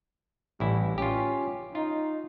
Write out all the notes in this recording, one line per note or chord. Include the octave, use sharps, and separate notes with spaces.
A1 G3 E4
C#4 F4 G4
D#4 F4